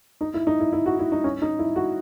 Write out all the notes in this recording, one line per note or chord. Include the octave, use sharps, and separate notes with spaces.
D#4
E4
D#4
E4
E4
F#4
E4
D#4
C#4
D#4
E4
F#4